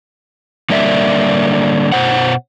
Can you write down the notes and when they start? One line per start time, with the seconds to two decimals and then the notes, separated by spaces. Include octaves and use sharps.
0.70 D3 G3 A#3 D5 E5
1.92 B2 C5 F#5